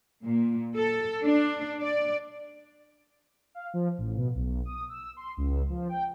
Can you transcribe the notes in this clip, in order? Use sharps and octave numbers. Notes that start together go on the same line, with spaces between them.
A#2
A4
D4
D5
F5
F3
A1
B2
B1
D#6
E6
C6
C#2
F3
G5